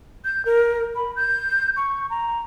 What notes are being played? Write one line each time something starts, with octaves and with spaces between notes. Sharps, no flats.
G6
A#4
B5
G6
C#6
A#5